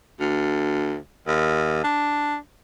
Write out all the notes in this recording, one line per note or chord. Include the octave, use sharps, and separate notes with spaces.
D2
D#2
D4